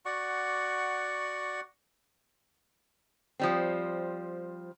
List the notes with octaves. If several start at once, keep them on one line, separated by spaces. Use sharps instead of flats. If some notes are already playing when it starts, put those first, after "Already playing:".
F#4 D5 F#5 C#6
F3 G3 C4